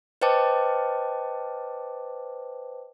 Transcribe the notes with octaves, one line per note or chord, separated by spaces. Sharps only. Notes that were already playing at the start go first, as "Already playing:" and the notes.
B4 C5 D#5 G5 A5 D6